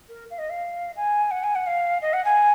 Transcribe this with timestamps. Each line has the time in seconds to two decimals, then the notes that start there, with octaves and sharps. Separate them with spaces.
0.09 A#4
0.30 F5
0.38 D#5
0.49 F5
0.96 G#5
1.31 F#5
1.43 G#5
1.55 F#5
1.66 F5
2.02 D#5
2.13 F#5
2.24 G#5